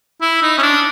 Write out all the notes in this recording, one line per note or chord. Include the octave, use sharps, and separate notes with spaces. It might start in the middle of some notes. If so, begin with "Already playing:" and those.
E4
D#4
C#4
D4